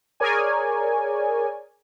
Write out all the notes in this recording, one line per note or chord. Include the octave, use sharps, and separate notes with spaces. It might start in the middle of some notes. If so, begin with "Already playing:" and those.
G#4 A#4 C#5 D5 G#5